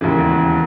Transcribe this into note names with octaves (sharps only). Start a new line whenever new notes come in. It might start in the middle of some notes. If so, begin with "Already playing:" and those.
E1 D#2 C#3 E3